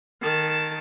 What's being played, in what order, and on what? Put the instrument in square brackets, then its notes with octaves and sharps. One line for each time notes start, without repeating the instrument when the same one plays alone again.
[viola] D#3 A5